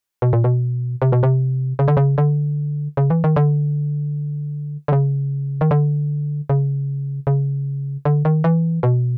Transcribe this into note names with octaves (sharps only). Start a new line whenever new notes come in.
B2
A#2
B2
C3
B2
C3
C#3
D3
C#3
D3
C#3
E3
D#3
D3
D3
C#3
D#3
D3
C#3
C#3
D3
D#3
E3
B2